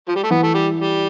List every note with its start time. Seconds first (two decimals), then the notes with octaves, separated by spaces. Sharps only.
0.08 F3
0.15 G3
0.23 A3
0.31 E3 B3
0.43 A3
0.54 G3
0.79 G3